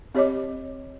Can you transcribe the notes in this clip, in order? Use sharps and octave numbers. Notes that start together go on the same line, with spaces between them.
C4 G4 C#5 D#5 D6